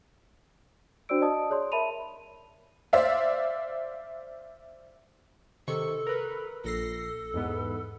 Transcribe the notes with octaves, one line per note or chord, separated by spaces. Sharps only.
D4 F#4 C5 D5 E6 D7
D5 D#5 A5 D#6
G#4 C#5 D5 C6
A#4 E5 A5 B5 D#7 F7
C5 D5 E5 F5
C3 D#3 A4 C#6
A#4 B4
A#1 A4 A#6 C7
E2 G#2 B3